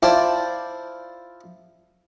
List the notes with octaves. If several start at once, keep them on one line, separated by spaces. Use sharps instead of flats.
E4 F4 C5 D5 G5 A5